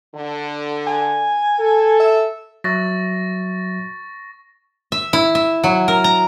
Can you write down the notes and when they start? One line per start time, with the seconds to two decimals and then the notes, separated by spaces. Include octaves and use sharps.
0.15 D3
0.87 G#5
1.59 A4
1.99 E5
2.64 F#3 E5 C#6 A6 A#6
4.92 E5
5.13 E4
5.35 E5
5.64 F#3
5.88 A#4
6.04 A#5